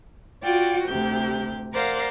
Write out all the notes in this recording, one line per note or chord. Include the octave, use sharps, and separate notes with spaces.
F4 F#4 D5 G5
D2 C3 G4 G6
A#4 C5 D5 F5 F#5